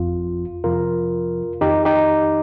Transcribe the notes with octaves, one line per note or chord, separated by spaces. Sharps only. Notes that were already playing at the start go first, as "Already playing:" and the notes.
Already playing: G1 F2 F3 F4
F2 C3 F3 F4 A#4
F2 D#3 D#4 G4
D#4 G4